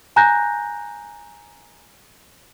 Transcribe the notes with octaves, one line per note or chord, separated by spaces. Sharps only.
G#5 A#5 F#6 G6 A#6